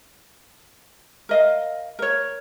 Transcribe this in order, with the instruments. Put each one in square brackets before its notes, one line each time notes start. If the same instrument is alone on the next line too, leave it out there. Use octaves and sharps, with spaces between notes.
[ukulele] A#4 D#5 F5
A#4 C#5